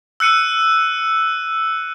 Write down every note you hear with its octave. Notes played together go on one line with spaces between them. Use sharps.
E6 F#6 C#7 D#7